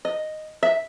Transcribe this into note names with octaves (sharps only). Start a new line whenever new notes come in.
D#5
E5